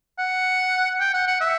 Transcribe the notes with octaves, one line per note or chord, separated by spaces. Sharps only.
F#5
G5
F#5
F#5
E5